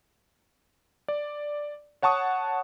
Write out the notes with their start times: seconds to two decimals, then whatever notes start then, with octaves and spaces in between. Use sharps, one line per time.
1.08 D5
2.02 C#5 F#5 A5 C#6 D#6